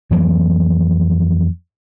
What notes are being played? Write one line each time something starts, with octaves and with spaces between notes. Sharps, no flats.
F2 E3 F#3 A#3